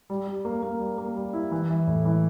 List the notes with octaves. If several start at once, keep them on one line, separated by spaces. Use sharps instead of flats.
G3
G3
A#3
A#3
G3
A#3
G3
E4
E3
E3
A2
E3